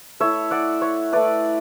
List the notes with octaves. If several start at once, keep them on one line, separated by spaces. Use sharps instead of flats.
A3 E4 C#5 E5
D5 F#5
C#5 E5
A3 E4 B4 D5